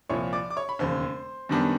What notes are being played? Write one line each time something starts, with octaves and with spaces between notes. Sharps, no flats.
C2 A#2 F3 C#5 C#6
D5 D6
D6
C#5 C#6
B5
E1 D#2 C#3 C5 C6
F#2 D#3 G3 B3 D4